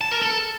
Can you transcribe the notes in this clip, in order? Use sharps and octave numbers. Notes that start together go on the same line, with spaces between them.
A5
A#4
A4